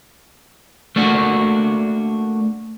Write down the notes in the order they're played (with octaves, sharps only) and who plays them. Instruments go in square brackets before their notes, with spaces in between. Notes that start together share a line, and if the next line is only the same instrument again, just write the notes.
[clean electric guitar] A3 A#3 D4 F#4